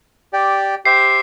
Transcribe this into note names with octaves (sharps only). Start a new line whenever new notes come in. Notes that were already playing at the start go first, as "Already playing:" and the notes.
G4 D5 G5
G4 C5 E5 G5 C7